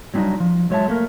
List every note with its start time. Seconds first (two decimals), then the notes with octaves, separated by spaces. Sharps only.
0.14 F#3 G3 C4 D4 D#4
0.40 F3
0.70 F#3 G#3 C#5 D#5 E5 A5
0.88 A3 A#3 A#4